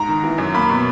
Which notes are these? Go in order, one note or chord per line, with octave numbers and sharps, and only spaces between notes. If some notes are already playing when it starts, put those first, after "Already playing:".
Already playing: G#2 A#5
D#3
E3
F#2
A#3 B5
B2